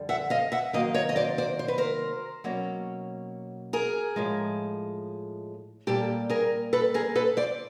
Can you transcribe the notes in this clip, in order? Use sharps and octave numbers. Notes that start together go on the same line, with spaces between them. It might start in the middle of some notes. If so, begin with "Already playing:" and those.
Already playing: F2 D3 G3
E5 F#5
D#5 F5
E5 F#5
C3 D#3 F#3 A#3 D#5 F5
C#5 D#5
D#5
C5 D5
C5 D5
C5
B4
A#4 C5
B2 F#3 A#3 C#4
G#4 A#4
A2 F3 G#3
A#2 G3 A#3 G4 A4
G#4 A#4
A4 B4
G#4 A#4
A4 B4
C5 D5